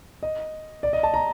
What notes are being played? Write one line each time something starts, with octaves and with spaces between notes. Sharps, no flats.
D#5
D5
D#5
A5
A#5